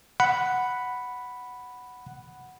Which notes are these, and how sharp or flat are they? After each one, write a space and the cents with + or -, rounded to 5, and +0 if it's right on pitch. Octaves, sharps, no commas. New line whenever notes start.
F#5 +0 B5 +0